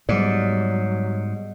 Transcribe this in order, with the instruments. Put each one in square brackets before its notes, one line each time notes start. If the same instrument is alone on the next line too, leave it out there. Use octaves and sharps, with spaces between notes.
[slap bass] G#2 [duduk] F#3 [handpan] G3 B3 D5